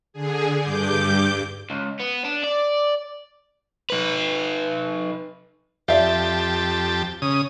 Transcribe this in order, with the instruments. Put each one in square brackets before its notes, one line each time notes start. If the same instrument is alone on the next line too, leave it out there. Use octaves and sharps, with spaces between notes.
[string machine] D3 G#4
G2 D6 G6
[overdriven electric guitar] C#2
B3
D4
D5
D#4 B4
[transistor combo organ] F2 G4 A5 [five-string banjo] D5 E5 F5
[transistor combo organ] C#3 D#6